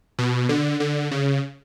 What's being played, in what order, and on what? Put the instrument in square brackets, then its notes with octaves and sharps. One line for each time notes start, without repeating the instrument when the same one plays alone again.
[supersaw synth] B2
D3
D3
C#3